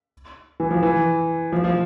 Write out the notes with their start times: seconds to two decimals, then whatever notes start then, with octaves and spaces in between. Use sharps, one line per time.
0.60 E3
0.71 F3
0.83 E3
1.52 F3
1.64 F3